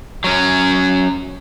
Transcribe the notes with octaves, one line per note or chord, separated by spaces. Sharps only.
F#3 C#4